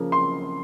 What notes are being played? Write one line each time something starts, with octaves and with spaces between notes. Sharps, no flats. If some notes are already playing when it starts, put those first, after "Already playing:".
Already playing: C#3 F3 A#3
C6